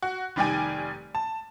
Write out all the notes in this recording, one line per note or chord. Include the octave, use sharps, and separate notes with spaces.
F#4
F1 D#3 G3 D5 G5 G#5
A5